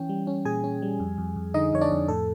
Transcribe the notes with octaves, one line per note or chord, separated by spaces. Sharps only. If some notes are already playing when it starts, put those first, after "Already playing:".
Already playing: E3 C#4 G5
G3
C#4
A#2 G#4 G#5
C#4
G3
F2
F2
F2
D3 D#4 D#5
F2 C#5
D4 D5
F2
A2 A4